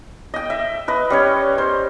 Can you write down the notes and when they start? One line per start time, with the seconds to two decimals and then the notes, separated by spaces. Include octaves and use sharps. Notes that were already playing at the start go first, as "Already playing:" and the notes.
0.34 D#5 G5
0.50 E5
0.88 B4 D#5
1.10 G3 C#4 C#5
1.58 C5